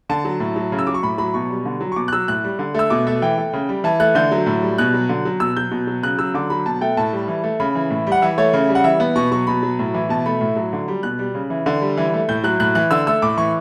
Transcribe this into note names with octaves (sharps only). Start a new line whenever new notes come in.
D3 A5
F#3
A2
F#3
C#3
E6
F#3 D6
C#6
A2 B5
F#3 B5
B2 C#6
G3
D3
F#3
C#6
B2 D6
F#6
F#3 E6
A2 F#6
G3
D3
A3 E6
B2 D6
A3 E5
E3 G5
A3
C#3
G3
E3 A5
A3 F#6
D3 G6
F#3
A2
G3
B2 F#6
F#3
D3
F#3
B2 E6
F#3 G6
B2
F#3
C#3 F#6
F#3 E6
D3 D6
F#3 B5
B2 A5
A3 G5
A2 A5
G3
E3
A3
C#3 B5
E3
A2
G3
F#5
E3 E5
A3 C#5
C#3
G3
F#5
E3 E5
B3
B2 C#6
F#3 C#6
B2 B5
F#3
A2
E3
B2 A5
A3 B5
A2
F#3
D3
G3
B2 F#6
G3
C#3
E3
D3
G3
E3
A3
A2 G6
F#3 F#6
A2 F#6
E3 F#6
D3 E6
A3 E6
A2 D6
E3 C#6